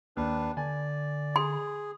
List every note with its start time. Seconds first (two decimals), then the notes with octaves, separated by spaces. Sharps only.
0.17 D#2 D4 B4
0.57 D3 D5 G#5
1.36 G#4 C6